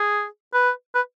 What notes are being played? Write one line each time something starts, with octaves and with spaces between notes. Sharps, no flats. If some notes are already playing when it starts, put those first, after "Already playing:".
Already playing: G#4
B4
B4